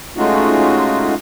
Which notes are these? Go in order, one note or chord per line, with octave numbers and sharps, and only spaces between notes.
G#3 A3 C#4 D#4 F4 F#4